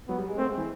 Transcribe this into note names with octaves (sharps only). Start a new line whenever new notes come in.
F#3 B3
G3
G#3
A3 C4
G#3
E3